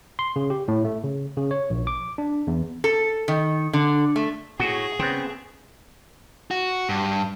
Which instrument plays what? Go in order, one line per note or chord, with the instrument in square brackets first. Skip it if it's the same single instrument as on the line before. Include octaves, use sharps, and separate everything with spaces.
[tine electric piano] C6
C#3
G4
A2
A3
C#3
C#3
C#5
A#1
D6
D4
E2
[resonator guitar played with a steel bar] A4
D#3
D3
A3
[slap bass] A2 [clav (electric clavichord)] F#4 [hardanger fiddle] G#4
[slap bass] C#3 [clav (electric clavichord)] B3 C4
[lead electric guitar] F#4
G2